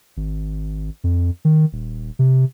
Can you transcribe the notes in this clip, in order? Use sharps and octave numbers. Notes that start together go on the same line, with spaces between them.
G#1
F2
D#3
D#1
C3